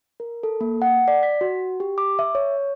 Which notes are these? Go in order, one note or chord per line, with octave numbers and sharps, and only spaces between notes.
A#4
A4
A#3
F#5
D5
B6
F#4
G4
D6
E5
C#5